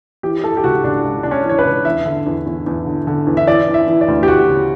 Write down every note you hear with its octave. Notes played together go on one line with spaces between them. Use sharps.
E3 G4
E3 A4
G4
C#2 F#4
C#2 D4
C#2
C#2 D4
C#4
E3 C#5
B4
C#2
E2 E5
D3
E2
E2
E2
D3
D3
E2
E5
E3 D5
E3
E5
E3
D5
D2
G4
D2 F#4
C#3